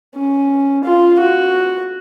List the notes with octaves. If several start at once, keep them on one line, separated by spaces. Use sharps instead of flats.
C#4
F4
F#4